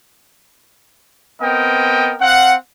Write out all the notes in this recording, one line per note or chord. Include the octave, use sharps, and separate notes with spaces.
B3 C4 A#4 D#5 G5
C4 F5 F#5